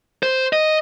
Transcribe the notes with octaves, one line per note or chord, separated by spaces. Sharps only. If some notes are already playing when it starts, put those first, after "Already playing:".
C5
D#5